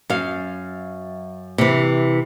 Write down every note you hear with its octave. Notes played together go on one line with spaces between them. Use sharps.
F#2 F5
C3 E3